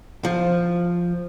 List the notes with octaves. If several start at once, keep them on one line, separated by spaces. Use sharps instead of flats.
F3